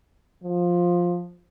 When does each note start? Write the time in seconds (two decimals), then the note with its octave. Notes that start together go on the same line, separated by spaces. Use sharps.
0.43 F3